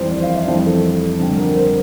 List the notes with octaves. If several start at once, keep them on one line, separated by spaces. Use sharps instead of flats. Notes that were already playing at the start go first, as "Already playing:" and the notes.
Already playing: F2 E3 G3 C5
D5
F5
E5
F2 E3 G3 C5
A4
F2 D3 G3
A#4
C5